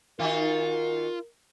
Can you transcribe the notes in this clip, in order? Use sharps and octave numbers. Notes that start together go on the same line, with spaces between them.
D#3 D#4 F4 F#4 A#4